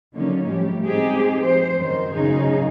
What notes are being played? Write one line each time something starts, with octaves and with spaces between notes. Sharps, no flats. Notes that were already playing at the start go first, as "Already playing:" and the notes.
D3 F#3 A#3 C#4 D#4
A2 F3 G3 G4
G#3 C4 D#4 G4 G#4
F3 C5
F#2 D#3 C5
F#2 A2 C#3 C#4 D#4 G#4